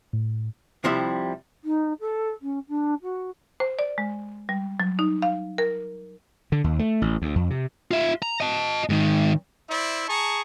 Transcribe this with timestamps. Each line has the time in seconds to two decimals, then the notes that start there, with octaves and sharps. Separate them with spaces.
0.13 A2
0.84 C2 C3 F3 G3 E4 E5
1.64 D#4
2.00 A4
2.41 C#4
2.68 D4
3.02 F#4
3.60 C5
3.79 D5
3.98 G#3
4.49 G3
4.80 F#3
4.99 D#4
5.22 F5
5.58 A#4
6.52 D3
6.64 D#2
6.79 A3
7.02 A1
7.22 D2
7.35 F2
7.50 C3
7.91 F4 E5
8.22 A#5
8.41 D#5 A5
8.89 G#2 D#3
9.69 E4 C5 D5 E5
10.08 G#4 A5 A#5 C#6